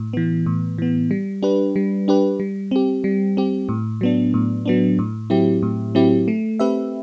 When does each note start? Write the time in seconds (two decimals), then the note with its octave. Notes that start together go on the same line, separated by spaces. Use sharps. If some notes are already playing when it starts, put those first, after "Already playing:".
Already playing: A2
0.13 E3 B3
0.46 A2
0.78 E3 B3
1.11 G3
1.42 D4 G4 B4
1.76 G3
2.08 D4 G4 B4
2.40 G3
2.71 C4 G4
3.04 G3
3.37 C4 G4
3.69 A2
4.01 F#3 B3 D4
4.34 A2
4.66 F#3 B3 D4
4.99 A2
5.30 F#3 C4 E4 G4
5.63 A2
5.95 F#3 C4 E4 G4
6.28 A3
6.59 C4 G4 B4 E5